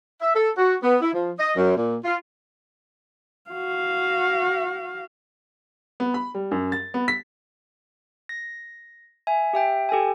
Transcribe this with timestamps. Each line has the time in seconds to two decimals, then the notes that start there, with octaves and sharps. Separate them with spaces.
0.22 E5
0.35 A4
0.57 F#4
0.83 B3
1.01 E4
1.13 F3
1.39 D#5
1.57 F#2
1.77 A#2
2.04 F4
3.51 F#4 F5
6.00 B3
6.14 B5
6.35 G3
6.51 F#2
6.72 A6
6.94 B3
7.08 B6
8.29 A#6
9.27 E5 G#5
9.53 G4 E5 G5
9.89 G4 A4 G5 G#5